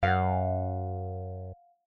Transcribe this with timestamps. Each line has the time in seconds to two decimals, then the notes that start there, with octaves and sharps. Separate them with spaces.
0.03 F#2 F5 F#5